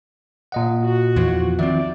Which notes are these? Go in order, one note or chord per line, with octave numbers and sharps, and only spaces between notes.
A#2 D#5 F#5
F#4
E2 E3 F3
D#3 F3 C4 D5 E5